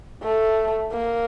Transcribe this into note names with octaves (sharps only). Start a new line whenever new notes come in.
A3
A#3